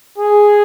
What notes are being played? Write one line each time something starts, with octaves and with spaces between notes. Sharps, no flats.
G#4